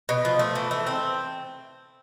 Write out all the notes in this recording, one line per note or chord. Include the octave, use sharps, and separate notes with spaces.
B2
F3
A3
E3
A3
C4